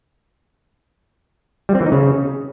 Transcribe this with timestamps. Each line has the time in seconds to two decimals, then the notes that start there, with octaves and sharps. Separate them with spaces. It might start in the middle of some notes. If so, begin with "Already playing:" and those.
1.69 G3
1.75 C4
1.81 E3
1.86 D#4
1.92 C#3